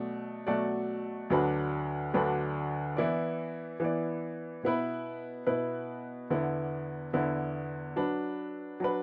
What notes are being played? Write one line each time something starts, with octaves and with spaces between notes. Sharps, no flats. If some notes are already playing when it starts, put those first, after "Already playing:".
Already playing: B2 F#3 A3 D5
B2 F#3 A3 F#4 D5
D2 D3 F#3 D4 B4
D2 D3 F#3 D4 B4
E3 B3 E4 D5
E3 B3 E4 D5
B2 B3 E4 B4
B2 B3 E4 B4
E2 D3 B3 E4
E2 D3 B3 E4
F#3 D4 B4
F#3 D4 B4